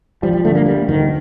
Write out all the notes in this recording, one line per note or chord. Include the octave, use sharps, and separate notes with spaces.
F3 G3
G3
D3 A3
A#3
G3 A#3
D2 D#3